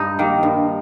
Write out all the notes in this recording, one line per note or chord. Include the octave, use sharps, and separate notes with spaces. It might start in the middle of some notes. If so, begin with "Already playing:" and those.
Already playing: G2 D#4
D#3 A#3
G2